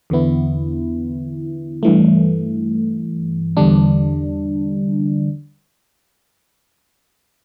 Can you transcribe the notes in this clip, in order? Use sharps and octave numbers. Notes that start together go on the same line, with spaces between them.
E2 D3 B3 E4
G2 E3 A3
E2 D3 G3 D4